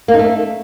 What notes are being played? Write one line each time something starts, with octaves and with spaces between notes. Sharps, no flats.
A#3
D#4
A3